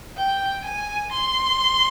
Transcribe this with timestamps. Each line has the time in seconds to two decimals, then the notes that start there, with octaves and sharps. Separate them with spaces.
0.18 G5
0.65 G#5
1.12 C6